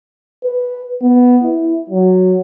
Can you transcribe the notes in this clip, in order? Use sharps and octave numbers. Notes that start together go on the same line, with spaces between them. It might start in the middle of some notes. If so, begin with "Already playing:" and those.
B4
B3
E4
F#3